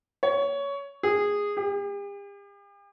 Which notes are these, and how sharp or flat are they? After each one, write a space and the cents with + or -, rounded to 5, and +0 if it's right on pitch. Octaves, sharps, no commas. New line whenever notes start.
C#5 +15
G#4 -15
G4 +45